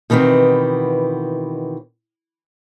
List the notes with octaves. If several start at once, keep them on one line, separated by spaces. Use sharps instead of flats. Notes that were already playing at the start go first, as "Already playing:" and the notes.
B2 D#3 E3 B3 C4